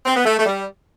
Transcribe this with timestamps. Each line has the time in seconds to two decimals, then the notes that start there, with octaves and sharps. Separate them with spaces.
0.06 C4
0.16 B3
0.25 A3
0.38 A3
0.46 G3